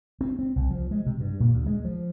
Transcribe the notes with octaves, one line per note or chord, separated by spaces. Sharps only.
C4
C4
C2
F3
G#3
C3
G2
A#2
D2
G#3
F3